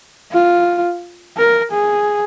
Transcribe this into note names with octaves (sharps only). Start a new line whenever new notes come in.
F4
A#4
G#4